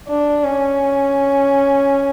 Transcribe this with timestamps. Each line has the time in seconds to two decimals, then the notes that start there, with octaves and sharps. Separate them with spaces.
0.08 D4
0.44 C#4